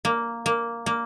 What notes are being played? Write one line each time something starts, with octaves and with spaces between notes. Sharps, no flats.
A#3
A#3
A#3